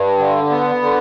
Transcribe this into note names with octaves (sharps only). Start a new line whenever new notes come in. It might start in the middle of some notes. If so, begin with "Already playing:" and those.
Already playing: G2
D3
B3
D3